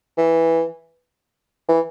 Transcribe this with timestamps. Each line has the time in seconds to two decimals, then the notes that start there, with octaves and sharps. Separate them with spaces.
0.18 E3
1.69 E3